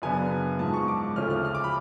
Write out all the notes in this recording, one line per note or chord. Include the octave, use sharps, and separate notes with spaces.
F#2 C#3 F#3 B3 D4 G#5
G#2 F3 G#3 A5
C#6
D6
D2 C#3 F3 A3 C#4 F6
F6
F6
D6
B5